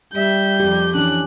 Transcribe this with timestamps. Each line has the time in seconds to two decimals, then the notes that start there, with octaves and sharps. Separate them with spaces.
0.15 G3 E5 G6
0.60 F2 G4
0.95 E3 C#4 D4 F#6